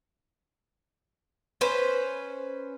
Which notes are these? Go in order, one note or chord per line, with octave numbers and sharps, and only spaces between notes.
C#4 B4 C5